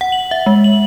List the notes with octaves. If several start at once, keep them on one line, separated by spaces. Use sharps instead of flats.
F#5
F#7
E5
G#3
F#7